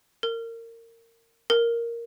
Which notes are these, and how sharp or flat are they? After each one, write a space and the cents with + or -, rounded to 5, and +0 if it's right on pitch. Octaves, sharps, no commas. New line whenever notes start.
A#4 -25
A#4 +0